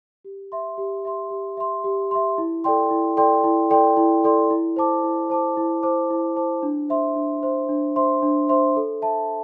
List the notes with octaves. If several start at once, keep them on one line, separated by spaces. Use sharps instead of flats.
G4
E5 C6
G4
E5 C6
G4
E5 C6
G4
E5 C6
E4
A4 D5 G5 C6
E4
A4 D5 G5 C6
E4
A4 D5 G5 C6
E4
A4 D5 G5 C6
E4
C5 A5 D6
E4
C5 A5 D6
E4
C5 A5 D6
E4
C5 A5 D6
D4
C5 E5 C6
D4
C5 E5 C6
D4
C5 E5 C6
D4
C5 E5 C6
A4
E5 A5